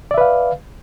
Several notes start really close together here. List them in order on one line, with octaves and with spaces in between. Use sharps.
D5 E5 B4 F5